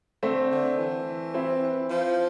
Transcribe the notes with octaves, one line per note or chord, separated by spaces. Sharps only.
D3 A3 C4
D3
E3
C4 E4
F3